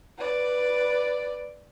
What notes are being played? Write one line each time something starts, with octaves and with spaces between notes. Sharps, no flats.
B4 D5